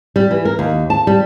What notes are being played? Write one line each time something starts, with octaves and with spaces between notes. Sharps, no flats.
G3
E3
A#4
D#2
A5
G3